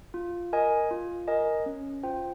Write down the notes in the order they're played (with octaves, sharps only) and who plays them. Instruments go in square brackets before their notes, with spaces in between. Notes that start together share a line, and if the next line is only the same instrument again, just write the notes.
[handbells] F4
A#4 D#5 G#5
F4
A#4 D#5 G#5
C#4
F4 C5 G5